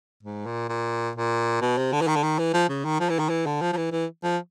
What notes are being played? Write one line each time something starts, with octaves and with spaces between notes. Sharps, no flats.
G#2
A#2
A#2
A#2
B2
C3
D3
E3
D#3
D3
D#3
E3
F3
C#3
D#3
F3
E3
D#3
E3
D3
F3
F3
E3
E3
F3